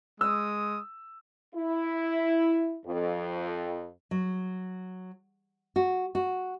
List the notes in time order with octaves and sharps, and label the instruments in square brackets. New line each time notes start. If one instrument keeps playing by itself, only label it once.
[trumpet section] G#3 D#6 [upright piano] E6
[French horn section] E4
F2
[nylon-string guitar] F#3
F#4
F#4